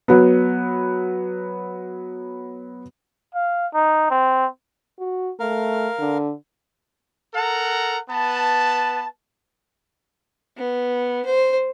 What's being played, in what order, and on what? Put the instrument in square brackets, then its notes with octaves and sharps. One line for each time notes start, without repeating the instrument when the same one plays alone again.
[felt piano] F#3 B3
[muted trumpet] F5
D#4
C4
[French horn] F#4
[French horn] A3 [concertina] A#4 F5
[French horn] D3
[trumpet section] A4 A#4 F#5 A#5
B3 B4 A5
[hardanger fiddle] B3
C5